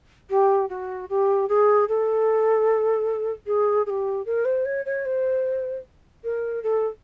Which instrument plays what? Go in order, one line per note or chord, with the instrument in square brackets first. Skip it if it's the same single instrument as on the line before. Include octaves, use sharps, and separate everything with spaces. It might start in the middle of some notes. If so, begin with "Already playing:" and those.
[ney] G4
F#4
G4
G#4
A4
G#4
G#4
G4
A#4
C5
C#5
C#5
C5
A#4
A4